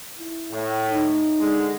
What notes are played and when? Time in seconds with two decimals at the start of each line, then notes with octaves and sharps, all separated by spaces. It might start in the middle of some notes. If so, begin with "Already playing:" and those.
0.19 E4
0.51 A2
0.90 D#4
1.39 D3 G#3